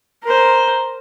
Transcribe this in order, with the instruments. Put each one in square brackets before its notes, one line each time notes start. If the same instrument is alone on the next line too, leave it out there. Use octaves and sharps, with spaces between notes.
[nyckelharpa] A#4 C5